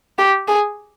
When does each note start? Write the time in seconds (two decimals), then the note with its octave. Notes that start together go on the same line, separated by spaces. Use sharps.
0.19 G4
0.48 G#4